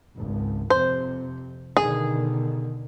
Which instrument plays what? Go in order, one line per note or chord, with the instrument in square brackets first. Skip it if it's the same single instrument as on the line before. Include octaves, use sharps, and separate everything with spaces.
[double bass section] G#1 C#2
[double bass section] F2 C3 [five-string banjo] C5
[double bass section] B2 D3 D#3 [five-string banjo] G#4